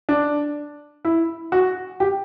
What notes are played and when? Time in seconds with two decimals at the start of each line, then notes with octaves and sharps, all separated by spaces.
0.09 D4
1.05 E4
1.52 F#4
2.00 G4